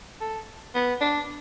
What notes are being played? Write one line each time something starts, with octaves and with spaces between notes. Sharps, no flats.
A4
B3
D4